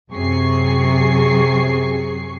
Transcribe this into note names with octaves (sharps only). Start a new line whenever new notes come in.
F#2 C3 F#3 G#4 C#6 C7